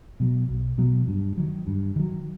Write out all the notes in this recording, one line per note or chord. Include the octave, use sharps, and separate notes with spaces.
B2 F#3
B1
B2 F#3
G2
D#3 F#3
G2
D#3 F#3